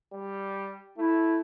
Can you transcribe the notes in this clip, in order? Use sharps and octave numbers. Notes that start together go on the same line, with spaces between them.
G3
A3 E4